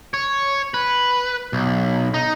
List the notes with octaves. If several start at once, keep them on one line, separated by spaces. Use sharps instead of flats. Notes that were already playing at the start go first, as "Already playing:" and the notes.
C#5
B4
B1
D#4